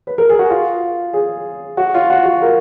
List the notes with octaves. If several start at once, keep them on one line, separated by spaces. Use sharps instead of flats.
B4
A#4
G#4
F#4
F4
G#4
F#4
F4
F#4
F#4
A#4